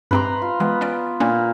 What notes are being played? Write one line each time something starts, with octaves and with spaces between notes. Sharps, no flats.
G2 C4 G4 B4 A#5 C6
F4
E3 G#3 B3
C#4 D5 D7
A#2 A#3 C#4 D4